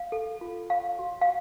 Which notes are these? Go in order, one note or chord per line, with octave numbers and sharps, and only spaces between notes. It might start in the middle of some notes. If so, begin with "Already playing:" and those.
Already playing: F5
A4
F4
C#5 F5
F#4
F5